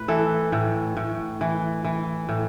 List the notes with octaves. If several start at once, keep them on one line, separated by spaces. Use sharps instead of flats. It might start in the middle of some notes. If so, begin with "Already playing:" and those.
Already playing: A2 B4
E3 A4
A2
A2
E3
E3
A2